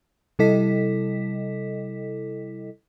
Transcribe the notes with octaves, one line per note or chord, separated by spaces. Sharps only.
C3 G3 E4 A4 D#5 B6